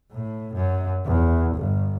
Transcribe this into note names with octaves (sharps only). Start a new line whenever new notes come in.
A2
F#2
E2
G1